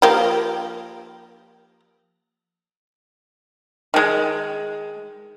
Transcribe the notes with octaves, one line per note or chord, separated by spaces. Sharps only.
F3 A#3 G4
D#3 G#3